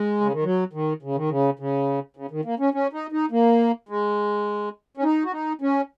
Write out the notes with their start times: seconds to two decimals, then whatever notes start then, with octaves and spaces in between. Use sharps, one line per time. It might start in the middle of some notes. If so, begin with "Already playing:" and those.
Already playing: G#3
0.21 C#3
0.32 D#3
0.44 F#3
0.73 D#3
1.02 C#3
1.16 D#3
1.29 C#3
1.59 C#3
2.17 C#3
2.31 D#3
2.45 A#3
2.59 C#4
2.74 C#4
2.93 D#4
3.12 D#4
3.31 A#3
3.89 G#3
4.97 C#4
5.03 D#4
5.25 F#4
5.33 D#4
5.61 C#4